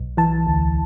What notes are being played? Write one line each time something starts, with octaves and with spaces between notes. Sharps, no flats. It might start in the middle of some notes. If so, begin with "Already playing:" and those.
Already playing: B1
E3 A5
D2